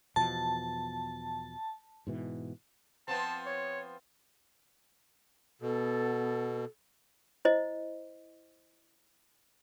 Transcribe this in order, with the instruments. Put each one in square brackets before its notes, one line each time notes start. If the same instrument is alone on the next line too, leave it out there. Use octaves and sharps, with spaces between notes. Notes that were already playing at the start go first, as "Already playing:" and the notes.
[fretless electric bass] E2 B2 F3 [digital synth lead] A5
[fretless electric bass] G#2 B2 E3
[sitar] F3 B3 C4 [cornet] A5
[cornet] C#5
[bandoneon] B2 [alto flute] B3 [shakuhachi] A4
[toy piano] E4 C5 D#5